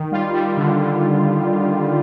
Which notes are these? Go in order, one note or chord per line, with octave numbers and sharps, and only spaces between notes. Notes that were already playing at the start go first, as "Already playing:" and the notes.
Already playing: D#3
G3 F4
G3
D3
D3